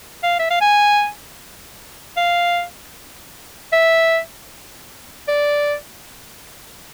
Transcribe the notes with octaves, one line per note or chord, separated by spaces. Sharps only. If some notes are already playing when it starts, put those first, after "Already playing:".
F5
E5
F5
G#5
F5
E5
D5